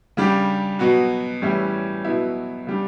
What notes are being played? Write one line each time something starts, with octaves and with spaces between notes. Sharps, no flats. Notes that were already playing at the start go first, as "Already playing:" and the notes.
C#3 G3 D4 G4
B2 F#3 B3 F#4
A2 E3 G3 C#4 E4
B2 F#3 B3 E4
C#3 G3 D4